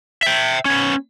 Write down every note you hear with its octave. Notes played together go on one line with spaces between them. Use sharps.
E5 G5
B3 C#4